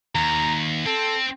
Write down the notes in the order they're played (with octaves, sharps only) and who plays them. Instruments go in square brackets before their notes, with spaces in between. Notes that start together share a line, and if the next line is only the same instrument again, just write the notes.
[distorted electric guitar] D#2 [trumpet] A#5
[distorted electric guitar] C4 [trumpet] A4